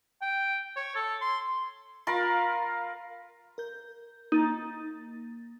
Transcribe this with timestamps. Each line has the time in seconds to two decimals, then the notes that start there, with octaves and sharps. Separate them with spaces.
0.22 G5
0.76 C#5
0.95 A4
1.21 C6
2.07 F4 A#4 F5 B5
3.58 A#4 G6
4.32 A#3 D#4 A6